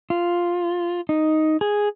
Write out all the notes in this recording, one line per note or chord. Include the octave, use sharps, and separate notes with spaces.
F4
D#4
G#4